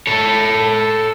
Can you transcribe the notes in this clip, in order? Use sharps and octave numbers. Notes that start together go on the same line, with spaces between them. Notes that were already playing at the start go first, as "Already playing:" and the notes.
A4 C#5